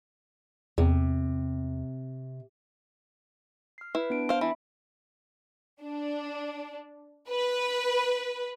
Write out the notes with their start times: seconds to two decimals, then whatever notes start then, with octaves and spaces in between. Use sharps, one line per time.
0.78 E2 C3
3.78 F6 C7
3.95 E4 B4
4.10 B3 D4 D7
4.29 C5 F5
4.41 E3 E5 B5
5.83 D4
7.29 B4